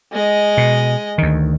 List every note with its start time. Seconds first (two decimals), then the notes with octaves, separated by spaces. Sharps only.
0.13 G#3 D#5
0.57 B2
1.18 D2 D#3